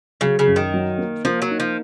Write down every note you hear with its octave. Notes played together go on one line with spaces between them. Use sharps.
C#3 F#3
C#3
F#2
D#3
F#3
A#3
F3 A#3
F#3
D#4
F3